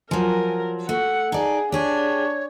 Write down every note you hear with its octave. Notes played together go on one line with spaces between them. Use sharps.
F3 F#3 A#4 G#5
A3 F#4 F#5
D#4 G#4 D5 A5
D4 G4 G#4 C#5